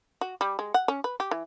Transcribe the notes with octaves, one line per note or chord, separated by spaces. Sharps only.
F#4
G3
G#3
F#5
C#4
B4
G4
E3